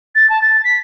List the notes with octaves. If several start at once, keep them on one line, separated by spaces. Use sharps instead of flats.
A6
A5
A6
B6